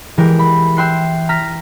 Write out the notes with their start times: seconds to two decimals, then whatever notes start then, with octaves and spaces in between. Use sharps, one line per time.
0.17 E3 G#3 G4 A#4
0.39 B5
0.77 E5 G5 C6 F#6 C7
1.29 A#5 F6 A#6 B6